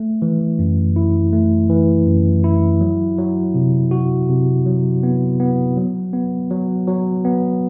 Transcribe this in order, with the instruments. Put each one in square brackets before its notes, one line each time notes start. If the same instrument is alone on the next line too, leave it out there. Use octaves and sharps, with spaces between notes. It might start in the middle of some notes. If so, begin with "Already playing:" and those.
Already playing: [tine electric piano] A3
E3
F#2
E4
A3
E3
F#2
E4
F#3
F#3
C3
F#4
C3
F#3
B3
B3
F#3
B3
F#3
F#3
B3